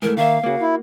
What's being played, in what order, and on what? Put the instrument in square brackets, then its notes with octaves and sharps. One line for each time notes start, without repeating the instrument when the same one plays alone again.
[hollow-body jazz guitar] G#2 E3 A3 [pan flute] A#4
[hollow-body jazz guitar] D#3 E5 [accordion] A#3 [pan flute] F5
[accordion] C#3 [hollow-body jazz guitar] A#3 F#4
[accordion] E4